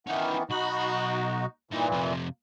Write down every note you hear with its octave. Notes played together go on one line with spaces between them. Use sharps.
D#3 E3 B3 C#4 D#4
B1 D#4 F#4 B5
G2 A#2 E3 D#4
F2 C3